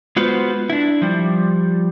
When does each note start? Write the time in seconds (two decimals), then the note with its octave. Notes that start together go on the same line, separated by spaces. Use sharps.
0.16 G#3 B3 F4 F#4 B4 C5
0.70 D4 E4
1.02 F3 G3